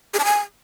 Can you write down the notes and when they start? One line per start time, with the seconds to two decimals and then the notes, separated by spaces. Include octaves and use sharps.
0.14 G#4
0.19 A5
0.25 G#5